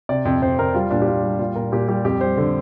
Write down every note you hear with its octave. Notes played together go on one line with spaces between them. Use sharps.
C3 D5
F2
F2 C5
F2 A#4
G3 F4
A#2 D4
G4
A#2 F4
G3
A#2 F4
A#2 A#4
A#2 G4
G3 G4
F2 G4
G3 C5
D3